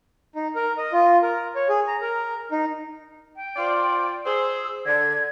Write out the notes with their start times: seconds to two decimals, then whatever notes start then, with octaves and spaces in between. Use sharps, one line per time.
0.35 D#4
0.56 A#4
0.78 D#5
0.93 F4
1.23 A#4
1.56 C#5
1.69 G#4
1.87 A#5
2.01 A#4
2.51 D#4
3.36 G5
3.56 F4 C5 D5
4.26 G#4 C5 E6
4.86 D3 G#6